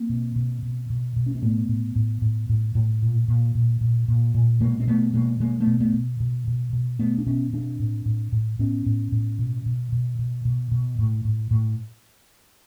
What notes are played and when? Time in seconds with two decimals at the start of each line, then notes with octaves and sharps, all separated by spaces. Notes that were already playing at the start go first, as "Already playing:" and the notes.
Already playing: A#3 C4
0.09 B2
0.36 B2
0.62 B2
0.90 B2
1.16 B2
1.26 C#4
1.35 C4
1.42 A2 A3 B3
1.69 A2
1.96 A2
2.22 A2
2.49 A2
2.75 A2
3.02 A#2
3.28 A#2
3.55 A#2
3.81 A#2
4.08 A#2
4.34 A#2
4.60 B2 G#3 A#3
4.80 C4
4.87 B2 A3 B3
5.14 B2 G#3 A#3
5.40 B2 G#3 A#3
5.60 A3 B3
5.67 B2
5.80 A3 B3
5.94 B2
6.20 B2
6.47 B2
6.73 B2
6.99 B2 A3 B3
7.18 D4
7.26 B2 B3 C#4
7.53 B2 C4 D4
7.80 A2
8.06 A2
8.32 A2
8.59 A2 B3 C#4
8.86 A2
9.12 A2
9.39 B2
9.66 B2
9.92 B2
10.19 B2
10.45 B2
10.71 B2
10.99 A2
11.25 A2
11.51 A2